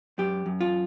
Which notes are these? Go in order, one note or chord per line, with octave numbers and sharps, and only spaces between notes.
F#2 G4
F#2
F4